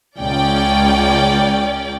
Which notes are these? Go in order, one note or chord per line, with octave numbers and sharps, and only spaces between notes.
C#2 C#4 D5 G5